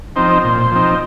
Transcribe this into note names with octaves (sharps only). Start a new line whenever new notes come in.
F3 C4 D#4 C5
A#2
F3 C4 D#4